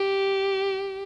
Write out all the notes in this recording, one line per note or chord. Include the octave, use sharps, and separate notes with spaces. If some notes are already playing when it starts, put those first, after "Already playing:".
Already playing: G4